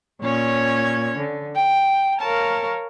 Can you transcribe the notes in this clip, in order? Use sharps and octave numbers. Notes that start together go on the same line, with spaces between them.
A#2 C#4 C#5 G#6
D3
G5
A#4 C#5 F5 A5 A#5